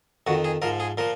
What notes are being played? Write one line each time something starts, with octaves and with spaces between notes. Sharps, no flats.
F2 D#3 F#4
G#4
G#2 F3 A#4
G#4
A#2 F3 A#4